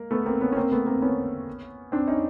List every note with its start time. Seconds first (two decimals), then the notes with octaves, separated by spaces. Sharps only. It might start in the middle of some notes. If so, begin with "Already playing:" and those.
Already playing: G#3 A#3
0.11 A3 B3
0.26 A#3 C4
0.41 B3 C#4
0.52 C#4
0.56 A#3 C4
0.72 A3 B3
0.86 A#3 C4
1.02 B3 C#4
1.92 C4 D4
2.08 C#4 D#4